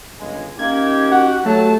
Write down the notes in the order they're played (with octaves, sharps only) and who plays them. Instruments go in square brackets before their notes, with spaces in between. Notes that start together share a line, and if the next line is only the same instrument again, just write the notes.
[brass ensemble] G1 C#2 G#3
[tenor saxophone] A#3 [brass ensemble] C#4 D#4 G4 [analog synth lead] G#6
[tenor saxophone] F#4 [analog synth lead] F#5
[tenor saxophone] F#3 [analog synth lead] A3 [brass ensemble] G4 A5